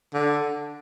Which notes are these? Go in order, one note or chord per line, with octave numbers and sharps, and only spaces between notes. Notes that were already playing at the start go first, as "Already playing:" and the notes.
D3